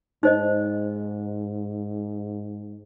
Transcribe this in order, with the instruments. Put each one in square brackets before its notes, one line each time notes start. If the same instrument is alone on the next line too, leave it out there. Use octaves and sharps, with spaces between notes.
[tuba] G#2 [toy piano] D#4 C5 D#5